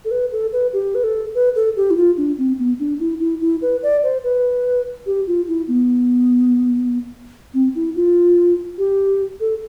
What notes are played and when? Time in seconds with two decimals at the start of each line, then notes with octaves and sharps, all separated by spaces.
0.05 A4
0.11 B4
0.32 A4
0.53 B4
0.73 G4
0.95 B4
1.04 A4
1.35 B4
1.56 A4
1.77 G4
1.91 E4
1.97 F4
2.17 D4
2.38 C4
2.59 B3
2.80 D4
3.00 E4
3.20 E4
3.42 E4
3.62 B4
3.83 D5
4.03 C5
4.24 B4
5.06 G4
5.27 F4
5.48 E4
5.68 B3
7.54 C4
7.75 E4
7.96 F4
8.78 G4
9.40 A4